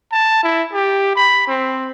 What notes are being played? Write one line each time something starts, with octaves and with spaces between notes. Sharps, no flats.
A5
E4
G4
B5
C4